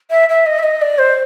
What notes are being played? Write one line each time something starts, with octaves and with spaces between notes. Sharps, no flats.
E5
E5
D#5
E5
D#5
D5
C5